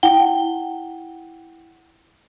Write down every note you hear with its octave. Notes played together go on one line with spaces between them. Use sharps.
E4 F#5 G5 G7